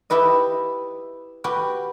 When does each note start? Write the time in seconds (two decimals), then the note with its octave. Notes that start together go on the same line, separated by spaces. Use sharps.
0.10 E4 G4 B4 D#5
1.44 F#4 G4 B4 G5